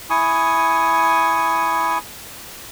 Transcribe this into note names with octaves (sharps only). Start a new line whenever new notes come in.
E4 G#5 C#6 D#6